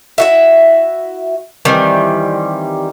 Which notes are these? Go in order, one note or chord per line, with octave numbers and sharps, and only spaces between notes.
E4 F#4 E5
D#3 E3 G3 C4